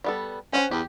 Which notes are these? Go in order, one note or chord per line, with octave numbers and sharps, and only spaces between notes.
G3 B3 A4
C#4 C5 F#5 G5
E2 G4